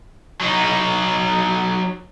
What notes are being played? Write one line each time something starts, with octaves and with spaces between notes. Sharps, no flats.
F#3 D#4